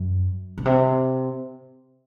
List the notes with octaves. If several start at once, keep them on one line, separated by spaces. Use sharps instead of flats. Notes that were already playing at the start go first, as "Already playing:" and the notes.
Already playing: F#2
B2
C3